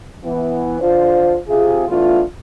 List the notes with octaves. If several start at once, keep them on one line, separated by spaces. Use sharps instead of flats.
E3 B3
D3 F4 C5
C3 F4 G#4
E3 A3 B3 D4 F4